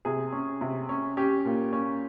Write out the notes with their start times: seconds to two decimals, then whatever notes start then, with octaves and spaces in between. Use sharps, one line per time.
0.05 C3 G#4
0.32 C#4
0.61 C3
0.89 C#4
1.17 C#4 G4
1.45 A#2
1.73 C#4